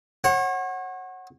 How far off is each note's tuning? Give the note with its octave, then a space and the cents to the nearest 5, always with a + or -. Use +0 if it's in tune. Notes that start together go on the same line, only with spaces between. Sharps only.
C#5 -40 F#5 +0